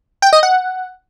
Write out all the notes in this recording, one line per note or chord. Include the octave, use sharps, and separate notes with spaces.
G5
D#5
F#5